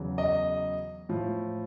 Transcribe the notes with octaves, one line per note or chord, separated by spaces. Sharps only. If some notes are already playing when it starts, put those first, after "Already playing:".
Already playing: E2 C#3 F#3
D#5
A2 F3